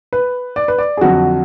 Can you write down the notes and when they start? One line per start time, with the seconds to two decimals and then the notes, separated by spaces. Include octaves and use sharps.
0.13 B4
0.56 D5
0.68 B4
0.78 D5
0.97 G#4
1.01 F2 D3 F#3 F#4